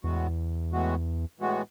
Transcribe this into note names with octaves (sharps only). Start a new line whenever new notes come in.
E2 A2 E3 G#3 B3 F#4
A2 E3 G#3 B3 F#4
A2 E3 G#3 B3 F#4